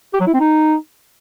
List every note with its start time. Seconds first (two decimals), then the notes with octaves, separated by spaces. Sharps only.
0.14 G4
0.21 F#3
0.27 E4
0.34 C4
0.40 D#4